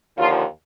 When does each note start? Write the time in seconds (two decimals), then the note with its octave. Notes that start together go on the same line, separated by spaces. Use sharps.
0.17 D#2 D3 F3 F4